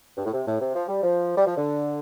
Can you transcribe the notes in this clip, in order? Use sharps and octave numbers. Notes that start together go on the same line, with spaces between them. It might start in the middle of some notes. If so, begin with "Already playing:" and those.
G2
A2
C3
A2
C3
F3
G3
F3
G3
F3
D3